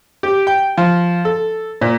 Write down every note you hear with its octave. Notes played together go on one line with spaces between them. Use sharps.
G4
G5
F3
A4
A#2